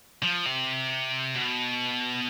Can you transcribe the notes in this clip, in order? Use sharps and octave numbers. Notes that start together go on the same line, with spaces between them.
F3
C3
B2